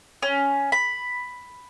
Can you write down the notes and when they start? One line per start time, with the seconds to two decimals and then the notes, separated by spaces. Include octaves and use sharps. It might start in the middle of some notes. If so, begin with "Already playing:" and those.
0.22 C#4
0.72 B5